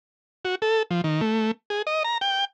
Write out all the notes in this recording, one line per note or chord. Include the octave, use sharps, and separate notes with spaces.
F#4
A4
F3
D#3
A3
G#4
D#5
A#5
G5